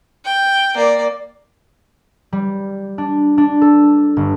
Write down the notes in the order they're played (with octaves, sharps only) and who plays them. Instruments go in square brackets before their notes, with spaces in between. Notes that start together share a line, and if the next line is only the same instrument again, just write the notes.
[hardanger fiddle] G5
A#3 D5
[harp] G3
D4
D4
A4
G1